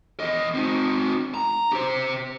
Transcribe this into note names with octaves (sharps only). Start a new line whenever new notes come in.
E2 D#5
C4 D#4
A#5
G4 C5